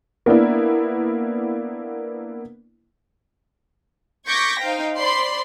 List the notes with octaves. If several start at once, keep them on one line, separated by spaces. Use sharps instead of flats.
A#3 B3 D4 E4
C#6 D6 G6 G#6 A#6 B6
D#4 C5 F5 G5
C5 D5 B5 C6